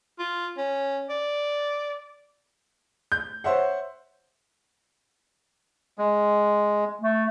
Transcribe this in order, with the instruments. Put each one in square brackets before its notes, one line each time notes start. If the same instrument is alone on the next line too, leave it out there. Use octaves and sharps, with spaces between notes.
[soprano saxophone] F4
C#4
D5
[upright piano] G6
C5 C#5 E5 F#5
[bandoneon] G#3
[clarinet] A3